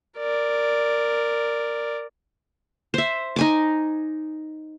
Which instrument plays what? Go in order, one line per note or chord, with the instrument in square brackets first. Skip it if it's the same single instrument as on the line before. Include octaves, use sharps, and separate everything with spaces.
[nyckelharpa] A#4 D5
[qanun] C5 E5
D#4 G#5 D6